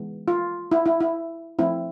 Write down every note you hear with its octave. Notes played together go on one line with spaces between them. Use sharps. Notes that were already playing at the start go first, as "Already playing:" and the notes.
Already playing: E3 G#3 B3
F4
E4
E4
E4
F3 A3 C4 E4